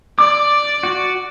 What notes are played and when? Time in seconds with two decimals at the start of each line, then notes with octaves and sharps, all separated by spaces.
0.19 D5 D6
0.83 F#4